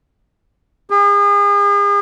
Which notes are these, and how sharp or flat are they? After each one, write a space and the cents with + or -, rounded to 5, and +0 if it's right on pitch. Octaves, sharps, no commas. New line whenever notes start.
G#4 -40